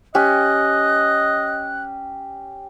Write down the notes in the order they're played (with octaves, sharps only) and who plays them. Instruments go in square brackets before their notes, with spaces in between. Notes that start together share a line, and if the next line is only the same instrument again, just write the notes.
[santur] C#4 G4 [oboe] D#5 [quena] F#6